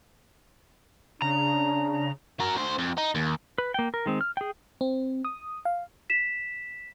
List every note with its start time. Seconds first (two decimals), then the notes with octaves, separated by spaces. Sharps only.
1.22 C#3 D4 A#5
2.40 F#3 A#4
2.56 D2 C5
2.79 F2
2.98 D#4
3.15 D#2
3.58 B4
3.74 A#3 G5
3.94 A#4
4.06 D#3 G#3 C4
4.21 F6
4.37 G#4 G5
4.81 C4
5.25 D#6
5.65 F5
6.10 B6 E7